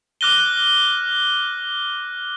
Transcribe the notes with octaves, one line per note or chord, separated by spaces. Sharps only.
D6 F6 F#6 A#6 D#7 G7